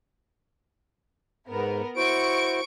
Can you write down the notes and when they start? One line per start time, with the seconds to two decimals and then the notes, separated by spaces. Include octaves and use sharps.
1.49 G#2 B3 A#4
1.97 E4 F#4 C5 C#6 D7